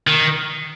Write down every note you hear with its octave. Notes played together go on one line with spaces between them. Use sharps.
D#3